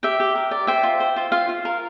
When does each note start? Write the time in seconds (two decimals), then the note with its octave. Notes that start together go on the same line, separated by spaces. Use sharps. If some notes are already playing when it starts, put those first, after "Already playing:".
0.03 G4 E5 G5
0.20 G4
0.35 A#4
0.51 D5
0.67 C5 E5 G5
0.83 F4
1.00 C5
1.16 F4
1.32 F4 F5
1.49 F4
1.65 A#4